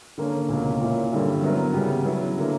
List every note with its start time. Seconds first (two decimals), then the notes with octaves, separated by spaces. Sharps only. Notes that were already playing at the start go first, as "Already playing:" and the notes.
0.18 D3 A#3 C#4
0.49 C#2 B2 A#3 C#4
0.81 A#2 A#3 E4
1.11 G2 D3 G3 C#4 E4
1.42 F#3 B3 E4 A#4
1.74 C#3 G3 B3
2.05 F#3 B3 E4
2.38 D3 A#3